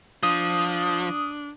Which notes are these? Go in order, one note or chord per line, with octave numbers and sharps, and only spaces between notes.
F3 D4 D#6